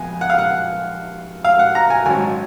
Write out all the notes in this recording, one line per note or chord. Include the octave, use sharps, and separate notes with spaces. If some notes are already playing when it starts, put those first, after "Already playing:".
Already playing: F2 G#3 B3 G#5
F#5
F5
F#5
F5
F#5
A#5
G#5
G#1 G#2 F#3 C#4 G#5